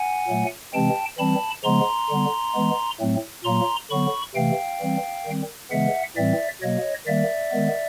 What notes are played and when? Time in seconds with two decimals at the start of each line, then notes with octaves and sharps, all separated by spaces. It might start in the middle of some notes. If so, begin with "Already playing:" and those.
Already playing: F#5 G#5
0.28 A#2 F#3 A3
0.73 C3 E3 G#3 C4 G5 A5
1.18 E3 G3 C4 A5 B5
1.64 C#3 F3 G#3 B3 A#5 C6
2.10 D3 G3 B3
2.55 E3 G#3 B3
3.00 A2 F#3 A3 C4
3.45 A#2 F#3 A#3 A#5 C6
3.90 D3 F#3 B3 B5 C#6
4.35 C3 E3 A3 F5 G5
4.81 E3 G3 C4
5.26 D#3 G3 C4
5.71 C#3 E3 G#3 B3 E5 F#5
6.16 A2 E3 G3 C4 D5 E5
6.61 B2 F#3 A#3 C#5 D#5
7.07 D#3 G3 A#3 D5 E5
7.52 D#3 G#3 B3